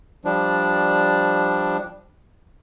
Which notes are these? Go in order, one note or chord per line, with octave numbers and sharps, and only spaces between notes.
F3 G3 D4